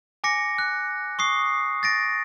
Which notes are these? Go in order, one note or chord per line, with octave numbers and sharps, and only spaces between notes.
G#5 D6 A#6 C#7
F#6
C#6 D#6 C7
A6 A#6 D7